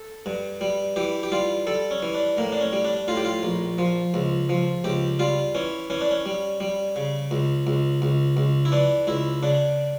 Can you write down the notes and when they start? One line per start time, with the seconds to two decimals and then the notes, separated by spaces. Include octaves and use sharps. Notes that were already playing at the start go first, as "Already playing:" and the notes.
Already playing: A4
0.26 G2
0.61 G3
0.96 E3 G4
1.23 G4
1.32 G3 F4
1.67 G3 A4
1.91 C#4
2.02 E3
2.14 D4
2.37 A2 A#3
2.52 D4
2.61 C#4
2.73 G3
2.85 D4
3.08 A2 F4
3.17 G4
3.25 F4
3.43 A#1
3.78 F3
4.14 C#2
4.49 F3
4.84 C#2 G4
5.19 G3 F4
5.55 E3 C#4
5.90 E3 C#4
6.01 D4
6.11 C#4
6.26 G3
6.60 G3
6.96 C#3
7.31 C#2
7.67 C#2
8.02 C#2
8.37 C#2
8.65 E4
8.72 E3 D4
9.07 C#2 E4
9.43 C#3 D4